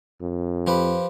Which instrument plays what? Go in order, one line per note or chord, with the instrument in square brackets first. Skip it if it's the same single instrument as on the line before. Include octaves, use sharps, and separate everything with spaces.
[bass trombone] F2
[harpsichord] F3 G4 B4